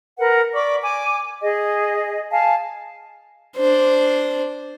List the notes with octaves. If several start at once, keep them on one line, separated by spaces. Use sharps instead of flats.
A#4 B4 F#5
D5 B5 C#6 D6
G#5 D6
G#4 D#5
F5 G#5 A5
D4 C5